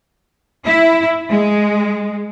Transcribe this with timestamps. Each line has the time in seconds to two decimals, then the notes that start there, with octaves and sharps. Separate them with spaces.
0.65 E4
1.31 G#3